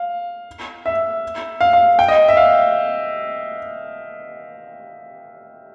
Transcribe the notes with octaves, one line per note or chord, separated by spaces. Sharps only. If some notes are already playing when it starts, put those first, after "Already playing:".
Already playing: F5
E5
F5
F5
G5
D#5
E5
F5